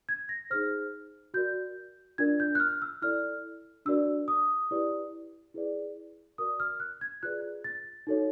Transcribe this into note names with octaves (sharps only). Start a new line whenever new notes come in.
G#6
A#6
D#4 G#4 C5 F6
F#4 A#4 D5 G6
D4 F4 A#4 D5 G#6
G6
F#6
F6
E6
E4 A4 D5 F6
D4 F#4 A#4 D5 E6
D#6
E4 G4 B4 D5
E4 G#4 B4 D5
F#4 A#4 D5 D#6
F6
F#6
G#6
F4 G#4 B4 D5 F#6
A6
D#4 F#4 A4 C#5